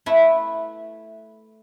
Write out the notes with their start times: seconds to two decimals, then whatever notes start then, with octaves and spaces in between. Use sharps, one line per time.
0.06 A3 E4 B4